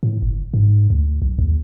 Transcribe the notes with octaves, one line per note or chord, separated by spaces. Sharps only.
A2
G1
G#2
D2
B1
D#2